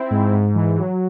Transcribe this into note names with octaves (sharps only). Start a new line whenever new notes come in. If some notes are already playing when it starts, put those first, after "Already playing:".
Already playing: C4 E4
G#2
G#2
E3
F#3